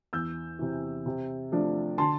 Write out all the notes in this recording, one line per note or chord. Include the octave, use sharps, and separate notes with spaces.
E2 E6 G6
C3 E3
C3
F3 A3 D4
D3 A5 C6